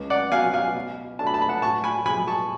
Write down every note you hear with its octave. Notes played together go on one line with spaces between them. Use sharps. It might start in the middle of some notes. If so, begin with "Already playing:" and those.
Already playing: C#2
D5 F#5
B2 F#3 F5 G#5
F5 G#5
B2
A3 D4 A5
B5
A5
B5
F#5 A5
A2 A5 C#6
G#5 B5
F3 G#3 G#5 B5
A5 C#6